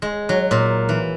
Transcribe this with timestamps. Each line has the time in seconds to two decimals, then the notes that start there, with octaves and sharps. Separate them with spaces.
0.02 G#3
0.29 F#3
0.51 A#2
0.89 E3